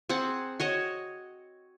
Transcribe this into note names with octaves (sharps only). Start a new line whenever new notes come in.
C4 G#4 F#5 A5
F#4 C#5 D#5